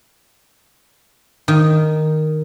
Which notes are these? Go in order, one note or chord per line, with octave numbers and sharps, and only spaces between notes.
D#3